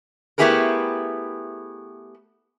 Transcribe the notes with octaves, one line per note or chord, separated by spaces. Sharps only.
A3 B3 E4 G4 G#4 A#4